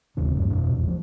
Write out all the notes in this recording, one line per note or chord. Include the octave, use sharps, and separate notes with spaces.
F#1 D#2 C#3 D4
E2 G2
F2 B2
G#1 E2
F3